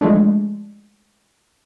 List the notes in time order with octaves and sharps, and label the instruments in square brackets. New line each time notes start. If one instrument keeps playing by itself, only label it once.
[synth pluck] F3 G#3 A3 D4